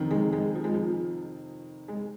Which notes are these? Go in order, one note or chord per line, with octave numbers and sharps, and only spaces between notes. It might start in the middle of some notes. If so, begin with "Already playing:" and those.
Already playing: F2 C3 D#3
G#3
G#3
F3
G#3
F3
G#3